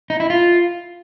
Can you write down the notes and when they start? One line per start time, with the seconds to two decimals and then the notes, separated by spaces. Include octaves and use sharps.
0.10 D#4
0.20 E4
0.30 F4